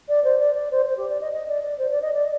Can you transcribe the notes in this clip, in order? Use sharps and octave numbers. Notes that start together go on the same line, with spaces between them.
D5
C5
D5
D5
C5
C5
G4
D5
D#5
D#5
D5
D5
C5
D5
D#5
D5